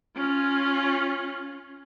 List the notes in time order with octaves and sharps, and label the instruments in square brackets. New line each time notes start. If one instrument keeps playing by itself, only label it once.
[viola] C#4 F4